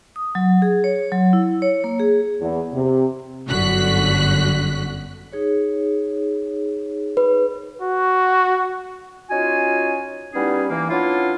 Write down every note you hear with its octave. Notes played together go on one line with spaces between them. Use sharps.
D#6
F#3
G#4
C#5
F#3
E4
C#5
A#3
G#4
E2
C3
G1 F#2 D3 F#4 F#6 B6
D#4 G#4 C#5
B4
F#4
C#4 D#4 F4 F#4 G#5
G3 B3 C#4 D#4 E4 G#4
E3 A#3
B3 C#4 D4 E4 F4